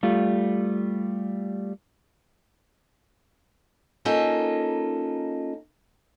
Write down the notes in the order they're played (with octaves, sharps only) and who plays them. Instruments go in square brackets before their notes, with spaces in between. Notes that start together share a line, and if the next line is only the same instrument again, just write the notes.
[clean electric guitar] G3 A3 F4
[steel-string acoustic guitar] A#3 C#4 D#4 F4 A4